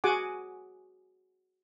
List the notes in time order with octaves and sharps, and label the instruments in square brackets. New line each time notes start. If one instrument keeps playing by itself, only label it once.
[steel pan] F#4 G#4 F#5 G#5 D6